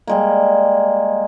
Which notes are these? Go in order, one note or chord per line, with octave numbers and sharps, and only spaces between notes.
G3 G#3 A#3